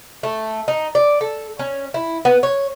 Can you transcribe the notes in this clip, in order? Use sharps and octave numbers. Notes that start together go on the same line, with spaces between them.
A3
D#4
D5
A4
C#4
E4
B3
C#5